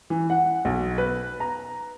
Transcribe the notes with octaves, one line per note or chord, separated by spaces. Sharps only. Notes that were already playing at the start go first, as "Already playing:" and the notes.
E3
F#5
B1
B4
A#5